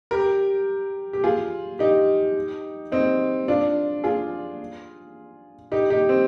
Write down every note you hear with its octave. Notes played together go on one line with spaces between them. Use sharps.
G4 A#4
G4
F4 G#4
D#4 G4
C4 D#4
D4 F4
F4 G#4
D#4 G4
D#4 G4
C4